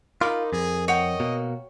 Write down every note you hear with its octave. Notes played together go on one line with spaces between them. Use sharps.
D#4 F4 A#4 B5 D6
F2 G#4
C#5 D#5 F#5 G5
B2 A#3